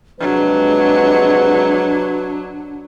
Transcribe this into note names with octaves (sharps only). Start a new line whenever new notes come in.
F2 C3 F#3 G#3 D4 B4